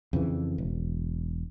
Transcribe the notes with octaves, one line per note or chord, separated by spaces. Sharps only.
F2 C#3 E3
E1